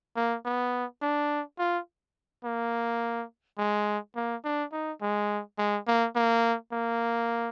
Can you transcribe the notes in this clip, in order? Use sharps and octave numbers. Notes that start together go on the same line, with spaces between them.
A#3
B3
D4
F4
A#3
G#3
A#3
D4
D#4
G#3
G#3
A#3
A#3
A#3